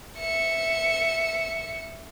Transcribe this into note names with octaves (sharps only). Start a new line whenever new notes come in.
E5 C#7